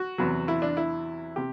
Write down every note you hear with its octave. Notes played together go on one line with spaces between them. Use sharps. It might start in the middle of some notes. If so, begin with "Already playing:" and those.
Already playing: F#4
E2 C3 F#3
E4
D4
E4
C3 G4